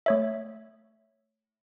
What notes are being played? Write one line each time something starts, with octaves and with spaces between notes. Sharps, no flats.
A3 C#5 E5